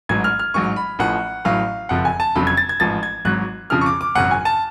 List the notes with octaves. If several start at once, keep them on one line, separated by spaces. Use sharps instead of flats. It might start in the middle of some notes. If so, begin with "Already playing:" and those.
A1 G#2 F#3 G#6
F6
F6
A1 G#2 F#3 C#6
B5
A1 A2 F3 F#5
A1 A2 F#3 F5
F#1 F2 F3 F#5
G#5
A5
F1 F2 C#3 F#3 B5
G#6
A6
G#6
A1 G#2 F3 A6
G#6
G#1 G#2 F#3 F#6
F2 C#3 F3 F6
C#6
D6
D6
G#1 F#2 C#3 F#3 F#5
G#5
A5